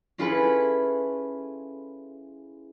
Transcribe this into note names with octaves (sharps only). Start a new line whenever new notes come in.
C#4 E4 F4 G#4 A4 B4